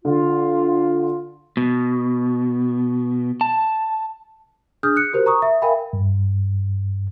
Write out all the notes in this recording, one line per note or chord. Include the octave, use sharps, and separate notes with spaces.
D3 F4
B2
A5
D4 G#4 D#6 F6 G6
F#6 C#7
F#4 G4 A#4 C5
A#5 C#6 D#6
E5
A#4 E5 F5 G5 G#5 B5
G2